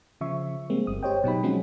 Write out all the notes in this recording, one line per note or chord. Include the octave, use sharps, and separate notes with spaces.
C#3 F3 E5 C#6
F3 G3 G#3 A#3 C4
G1 D#6
G4 C5 C#5 D#5 G5
B2 F#3 D#4 B5
F3 F#3 G#3 C4 C#4 F#4